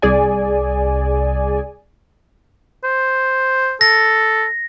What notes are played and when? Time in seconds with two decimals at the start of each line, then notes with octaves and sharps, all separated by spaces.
0.02 C2 G#4 D5 G#5
2.84 C5
3.81 A4 A#6